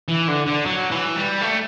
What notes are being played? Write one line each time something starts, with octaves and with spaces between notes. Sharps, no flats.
E3
D3
D3
F#3
E3
G3
A3